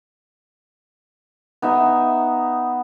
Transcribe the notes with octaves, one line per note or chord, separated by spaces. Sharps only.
B3 D#4 E5